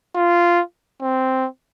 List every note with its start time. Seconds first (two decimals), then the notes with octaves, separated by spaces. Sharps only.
0.15 F4
1.01 C4